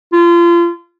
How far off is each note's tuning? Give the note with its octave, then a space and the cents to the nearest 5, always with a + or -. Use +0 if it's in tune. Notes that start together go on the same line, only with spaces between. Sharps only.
F4 -30